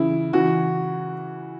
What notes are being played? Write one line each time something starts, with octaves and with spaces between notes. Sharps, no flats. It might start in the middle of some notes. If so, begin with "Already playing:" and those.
Already playing: C#3 E3 E4
C#3 E3 F#4